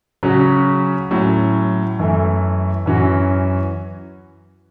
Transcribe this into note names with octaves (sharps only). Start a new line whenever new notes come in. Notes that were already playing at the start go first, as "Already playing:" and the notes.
C#3 F#3 C#4 F#4
A2 F#3 C#4
F#2 E3 A3 E4
F#2 E3 C#4 F#4